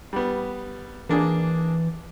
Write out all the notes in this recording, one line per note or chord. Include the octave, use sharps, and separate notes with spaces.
G3 B3
E3 A#3 D4 G#4